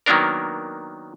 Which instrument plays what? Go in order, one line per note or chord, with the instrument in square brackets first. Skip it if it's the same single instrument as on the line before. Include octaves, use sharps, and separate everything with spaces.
[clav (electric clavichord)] D#3 F#3 A#3 B3 D4 A#4